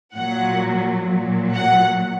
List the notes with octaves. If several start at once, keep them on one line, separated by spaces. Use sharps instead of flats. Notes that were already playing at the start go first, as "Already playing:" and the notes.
A#2 F#3 F#5
A#2 F#3
F#5